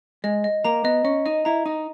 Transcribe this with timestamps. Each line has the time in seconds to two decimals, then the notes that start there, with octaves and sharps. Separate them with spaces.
0.24 G#3 D#5
0.44 D#5
0.65 A#3 A#5
0.84 B3 D#5
1.04 C#4 D#5
1.26 D#4 D#5
1.45 E4 A#5
1.65 D#4 D#5